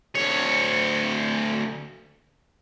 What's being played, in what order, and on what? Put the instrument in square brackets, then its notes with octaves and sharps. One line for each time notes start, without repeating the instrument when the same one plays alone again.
[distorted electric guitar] D2 C#5